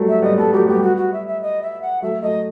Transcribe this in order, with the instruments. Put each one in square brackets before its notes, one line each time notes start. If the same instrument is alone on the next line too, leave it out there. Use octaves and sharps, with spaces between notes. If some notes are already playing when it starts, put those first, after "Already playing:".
Already playing: [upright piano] F#3 G3 A3
[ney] E5
[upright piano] G3 B3 [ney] D#5
[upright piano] G3 B3 [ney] A4
[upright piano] F#3 A3 [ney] G4
[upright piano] G3 B3 [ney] G4
[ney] F#4
F#4
E5
E5
D#5
E5
F#5
[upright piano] F#3 A3 [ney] E5
[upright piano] F#3 A3 [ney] D#5